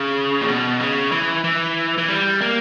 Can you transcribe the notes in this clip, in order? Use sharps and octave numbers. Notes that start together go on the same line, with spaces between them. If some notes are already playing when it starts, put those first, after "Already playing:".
Already playing: C#3
A#2
B2
C#3
E3
E3
E3
G3
A#3